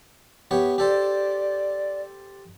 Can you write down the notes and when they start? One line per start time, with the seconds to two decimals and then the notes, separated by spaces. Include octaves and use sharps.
0.51 B3 G4 C#5 E5
0.78 G4 A4 C5 D5